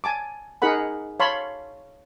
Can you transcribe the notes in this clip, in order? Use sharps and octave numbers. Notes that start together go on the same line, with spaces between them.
G#5 A5 D6
D#4 G#4 A#4 F#5 B5
C#5 F5 A5 B5 C6